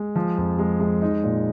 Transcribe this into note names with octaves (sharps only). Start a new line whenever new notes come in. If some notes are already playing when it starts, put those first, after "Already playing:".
Already playing: G#3
F3
F2
G#3
G#3
D#4
A#2